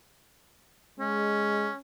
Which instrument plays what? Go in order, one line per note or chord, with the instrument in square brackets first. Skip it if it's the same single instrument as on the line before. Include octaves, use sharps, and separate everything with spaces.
[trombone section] G#3 [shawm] C#4